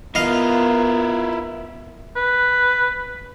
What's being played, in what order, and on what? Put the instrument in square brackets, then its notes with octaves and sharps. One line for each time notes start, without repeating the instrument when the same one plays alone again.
[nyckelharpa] B3 A#4 [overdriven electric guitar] E4 F4 [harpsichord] D#5 F5
[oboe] B4